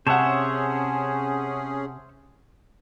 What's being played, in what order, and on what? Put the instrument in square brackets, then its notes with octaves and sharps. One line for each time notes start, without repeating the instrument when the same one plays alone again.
[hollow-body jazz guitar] C3 [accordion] C#4 G#4 [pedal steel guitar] C5 C#5 E5 [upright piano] F#5 A5